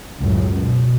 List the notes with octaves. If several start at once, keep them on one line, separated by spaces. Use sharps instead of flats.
C#2 F#2 A2
B2